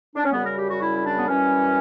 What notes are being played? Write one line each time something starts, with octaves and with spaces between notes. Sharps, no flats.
D4
C#4
F#2 C#3 G3 B3
A#4
G4
F#4
E4
D4
B3
F#2 E3 G3 C#4